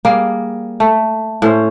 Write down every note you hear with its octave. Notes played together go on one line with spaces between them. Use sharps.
G3 A#3 G#4
A3
A2 C#4 C5